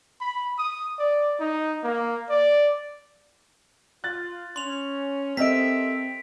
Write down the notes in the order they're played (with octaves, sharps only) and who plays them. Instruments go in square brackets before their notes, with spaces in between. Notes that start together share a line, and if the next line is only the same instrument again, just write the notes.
[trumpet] B5
D#6
D5
D#4
A#3
D5
[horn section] F4 [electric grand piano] F#6 A6
[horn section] C#4 [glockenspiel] C6 F7
[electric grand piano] C4 [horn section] G4 A4 E5 [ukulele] A#4 D#5 [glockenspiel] B6 D7